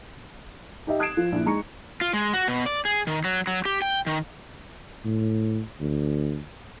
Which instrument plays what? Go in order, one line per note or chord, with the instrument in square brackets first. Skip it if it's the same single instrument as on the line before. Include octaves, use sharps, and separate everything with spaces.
[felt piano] D#4 G4 D#5 E5
D#6 F#6 G#6 C7 D7 E7
F3
A#1 E4
G#3 D#4 A#5 C#6 C#7
[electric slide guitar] F4
G#3
F#4
B2
D5
G#4
D#3
F#3
F#3
G4
G5
D#3
[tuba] A2
D2